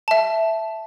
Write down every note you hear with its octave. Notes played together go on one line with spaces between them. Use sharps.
E5 A5